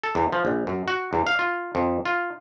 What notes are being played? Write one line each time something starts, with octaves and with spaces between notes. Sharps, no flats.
A4
E2
F3
A#1
F#2
F#4
E2
F5
F4
F2
F4